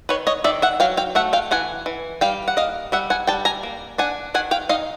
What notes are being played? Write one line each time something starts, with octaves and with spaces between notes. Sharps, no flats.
D#3 B4 C#5
C#5 D#5
D#3 D5 E5
E5 F#5
F#3 F5 G5
F5 G5
A3 E5 F#5
F5 G5
E3 F#5 G#5
E3
G3 F5 G5
F#5
A#3 D#5 F5
G3 E5 F#5
F#5 G#5
G3 G5 A5
G#5 A#5
A#3
D4 F#5 G#5
D#3 F#5 G#5
F5 G5
D#4 D#5 F5